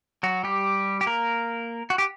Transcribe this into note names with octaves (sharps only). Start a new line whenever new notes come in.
F#3 F#4
G3 G4
G4
A#3 A#4
F#4
G4